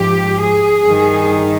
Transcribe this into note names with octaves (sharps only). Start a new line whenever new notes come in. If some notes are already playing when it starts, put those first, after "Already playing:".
Already playing: G#2 F3 G4
G#4
G2 D#3